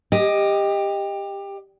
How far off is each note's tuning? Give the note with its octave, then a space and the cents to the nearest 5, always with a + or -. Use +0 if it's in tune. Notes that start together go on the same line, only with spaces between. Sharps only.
G4 +20 D#5 +0